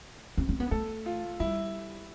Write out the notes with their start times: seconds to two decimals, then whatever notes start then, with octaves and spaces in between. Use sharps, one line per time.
0.38 C4
0.49 C4
0.60 B3
0.71 A3 A4
1.06 F4
1.40 G3 E4